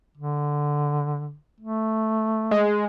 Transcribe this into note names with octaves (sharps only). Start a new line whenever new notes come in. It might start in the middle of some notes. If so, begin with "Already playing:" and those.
D3
A3
G#3